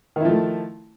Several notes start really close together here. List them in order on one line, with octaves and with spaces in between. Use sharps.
D#3 E4 F3 A3